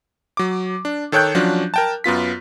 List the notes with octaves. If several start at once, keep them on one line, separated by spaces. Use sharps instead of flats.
F#3 D6
D4
D#3 A4 C#5 G5 F#6 G6
F3 F#3 C#4 D4
A#4 G5 A5
F#2 B3 F4 B6